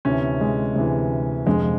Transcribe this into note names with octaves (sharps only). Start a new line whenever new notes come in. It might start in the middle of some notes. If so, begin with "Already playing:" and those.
D2 C3 E3 C#4
G#3
D2 C3 E3 G#3
F1 F2 D3 F3 G#3